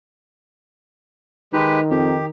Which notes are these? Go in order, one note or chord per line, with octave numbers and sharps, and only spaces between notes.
D#3 G#3 D#4 G4 B4
F2 G4